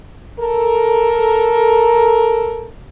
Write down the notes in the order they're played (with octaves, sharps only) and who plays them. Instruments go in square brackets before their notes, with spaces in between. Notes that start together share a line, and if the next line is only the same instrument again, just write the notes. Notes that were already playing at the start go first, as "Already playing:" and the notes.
[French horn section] A4 A#4